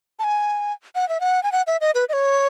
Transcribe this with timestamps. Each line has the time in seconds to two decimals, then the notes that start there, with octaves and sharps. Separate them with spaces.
0.19 A5
0.24 G#5
0.95 F#5
1.09 E5
1.20 F#5
1.43 G#5
1.52 F#5
1.67 E5
1.81 D#5
1.95 B4
2.09 D#5
2.13 C#5